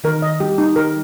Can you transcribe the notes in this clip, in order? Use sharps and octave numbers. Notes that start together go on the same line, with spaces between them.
D#3 A#4
D#5
G3 G4
D#4
G3 A#4